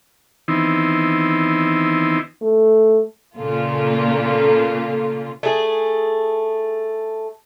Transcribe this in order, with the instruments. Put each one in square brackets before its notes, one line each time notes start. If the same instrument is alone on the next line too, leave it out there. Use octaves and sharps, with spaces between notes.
[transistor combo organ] D#3 E3 B3 C4 D#4 E4
[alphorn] A3
[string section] A#2 C#3 A#3 F4 A4
[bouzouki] A3 G#4